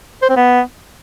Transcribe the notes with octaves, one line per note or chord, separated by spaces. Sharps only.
C5
C4
B3